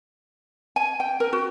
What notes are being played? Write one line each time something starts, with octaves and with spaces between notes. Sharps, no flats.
G#5
G5
A#4
F#4